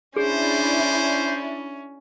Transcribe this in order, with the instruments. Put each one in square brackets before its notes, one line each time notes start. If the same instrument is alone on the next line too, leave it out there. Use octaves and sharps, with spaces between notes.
[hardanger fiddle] C#4 [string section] D4 E4 D5 [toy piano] G#4 [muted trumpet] C5